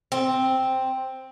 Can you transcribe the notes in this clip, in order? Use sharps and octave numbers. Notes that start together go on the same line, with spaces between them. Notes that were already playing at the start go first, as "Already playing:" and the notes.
C4